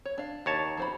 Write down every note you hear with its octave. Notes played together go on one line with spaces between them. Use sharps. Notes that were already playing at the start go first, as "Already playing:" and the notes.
C#5
D4 F5
D#2 C#5 A5
F3 C5 B5